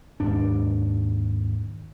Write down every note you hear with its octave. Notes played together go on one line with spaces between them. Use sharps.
D#2 G#2 D4